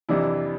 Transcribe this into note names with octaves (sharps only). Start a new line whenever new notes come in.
F2 C3 E3 D4 E4